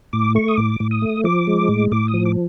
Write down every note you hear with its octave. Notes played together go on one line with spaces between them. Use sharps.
A2 D6
A3 C#6
D#6
A2 D6
A2
D#6
A3
F3 D6
G#3
A2
A2 D6
D#6
F3
D6